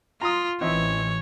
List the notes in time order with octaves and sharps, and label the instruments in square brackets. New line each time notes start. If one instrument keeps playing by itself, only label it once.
[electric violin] F4 [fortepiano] A#5 C6 D#6
[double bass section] A1 E3 [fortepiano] C4 D#4 E5 [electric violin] C#5